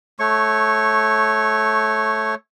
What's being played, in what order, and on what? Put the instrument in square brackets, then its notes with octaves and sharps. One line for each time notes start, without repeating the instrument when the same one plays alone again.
[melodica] A3 C#5 C#6